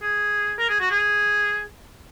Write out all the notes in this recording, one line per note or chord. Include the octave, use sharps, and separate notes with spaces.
G#4
A#4
G#4
F#4
G#4